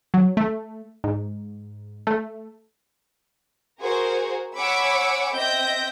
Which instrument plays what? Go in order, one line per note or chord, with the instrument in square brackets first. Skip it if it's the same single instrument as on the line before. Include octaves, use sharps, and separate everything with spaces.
[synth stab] F#3
A3
G#2
A3
[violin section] F#4 G#4 A#4 C5
C#5 F#5 G#5 B5 D6 E6
C4 D#5 E5 G5 G6 A#6